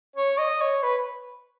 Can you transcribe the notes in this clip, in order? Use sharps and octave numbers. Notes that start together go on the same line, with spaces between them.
C#5
D#5
C#5
B4